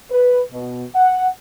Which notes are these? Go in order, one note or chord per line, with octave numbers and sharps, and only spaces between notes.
B4
B2
F#5